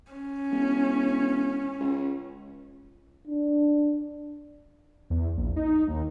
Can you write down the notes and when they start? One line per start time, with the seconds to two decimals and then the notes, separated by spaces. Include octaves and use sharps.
0.12 C#4
0.51 E1
1.80 C#2
3.28 D4
5.10 E2
5.37 A#1
5.56 D#4
5.88 D#2